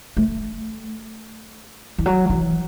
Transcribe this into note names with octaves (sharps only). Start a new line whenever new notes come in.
A3
E3
F#3
E3